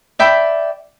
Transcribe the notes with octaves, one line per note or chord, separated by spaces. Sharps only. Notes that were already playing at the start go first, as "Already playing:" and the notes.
D5 E5 G5 B5